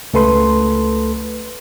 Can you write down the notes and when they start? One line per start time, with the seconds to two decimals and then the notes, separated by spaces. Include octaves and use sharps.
0.13 C#2 A3 A4 B4 C6